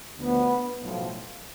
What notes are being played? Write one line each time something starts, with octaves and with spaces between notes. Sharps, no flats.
D2 D3 F3 B3
B1 A2 F3